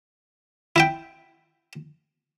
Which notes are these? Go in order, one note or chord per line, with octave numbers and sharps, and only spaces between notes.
E4 E5 G5